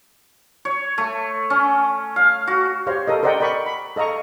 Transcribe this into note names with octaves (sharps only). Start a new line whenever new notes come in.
C#5
A3
C#4
F5
F#4
G4 C5 C#5 F5
A4 A#4 D#5
A#4 C5 D5 D#5 F#5 G5
A#4 D5 B5 C#6
B5
A4 D#5 F5 A#5 C#6